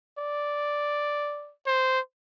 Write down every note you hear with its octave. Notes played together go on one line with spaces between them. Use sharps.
D5
C5